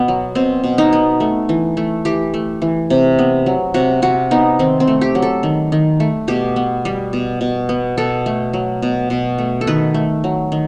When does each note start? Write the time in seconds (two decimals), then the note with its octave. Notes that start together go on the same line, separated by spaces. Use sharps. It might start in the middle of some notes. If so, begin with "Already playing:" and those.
Already playing: B2 B3
0.08 F#3
0.35 B2 C4
0.64 B2
0.78 D#4
0.93 B3
1.20 A3
1.49 E3
1.77 A3
2.05 E3 G4
2.34 A3
2.62 E3
2.90 C3
3.19 B3
3.46 F#3
3.74 C3 F#4
4.02 C3 F#4
4.31 B3 D#4
4.59 D#3 C4
4.80 C4
4.87 A3
5.01 G4
5.15 F#3
5.22 A4
5.43 D#3
5.72 D#3
6.00 A3
6.28 B2 G4
6.56 B3
6.85 G3
7.13 B2
7.41 B2
7.69 B3
7.98 B2 A4
8.26 A3
8.53 F#3
8.82 B2
9.10 B2
9.38 A3
9.61 A4
9.67 D#3 B4
9.94 A3
10.24 F#3
10.52 D#3